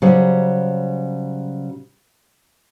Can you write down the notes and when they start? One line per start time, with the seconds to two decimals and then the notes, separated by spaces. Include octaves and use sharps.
0.02 C#3 F#3 G3 C5